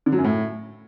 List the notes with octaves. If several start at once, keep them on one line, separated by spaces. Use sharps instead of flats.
D3
F#3
F#2
A2